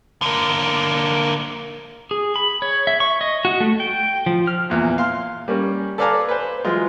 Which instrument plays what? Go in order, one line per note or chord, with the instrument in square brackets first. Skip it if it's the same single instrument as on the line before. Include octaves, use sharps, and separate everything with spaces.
[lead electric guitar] D3 A#3
[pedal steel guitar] G#4
B5
C#5
E5
C#6
D#5
F#4
A3
G5
F3
F6
[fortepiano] E2 A#2
F5 C6
G3 A#3 C#4
A4 B4 D5 F5 G#5 A#5
B4 C5
E3 F#3 G#3 F4